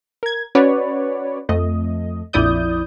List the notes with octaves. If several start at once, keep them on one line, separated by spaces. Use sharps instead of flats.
A#4 G#6
C#4 F#4 B4 C#5 D5
F2 A3 D#5
A#1 F2 E4 D5 D#6 G6